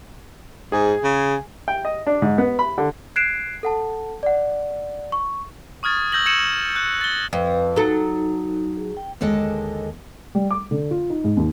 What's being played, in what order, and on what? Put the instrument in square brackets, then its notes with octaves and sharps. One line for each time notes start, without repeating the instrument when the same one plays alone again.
[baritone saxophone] G#2 [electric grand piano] G#4 G#5
[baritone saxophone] C#3
[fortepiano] G5
D#5
D4
G#2
B3
B5
D3
[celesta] F#6 G#6 C7 D7 E7
A4 F#5 A5
D5 F#5
C#6
[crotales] C#6 D#6 F6 G#6 A6
E6 G6 A#6 F#7
E6 G#6 C#7 D#7 E7 F#7
F#6 G6
A6 G7
[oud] F2 [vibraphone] B4 F5
[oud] F#3 A4 [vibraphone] D#4
[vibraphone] G#4
G5
[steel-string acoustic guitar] D#2 D3 G#3 A4 D#5 A5
[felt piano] G3
D6
D3
F4
D#4
G#2
D#2